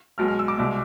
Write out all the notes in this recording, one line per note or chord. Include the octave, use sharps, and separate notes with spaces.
B1 B2 G#3 F6
F6
E6
D6
C2 B2 G#3